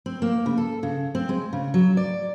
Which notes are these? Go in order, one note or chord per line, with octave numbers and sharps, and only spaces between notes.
C4
A#3
C#3
A4
C#3
C4
G#3
C#3
F#3
D5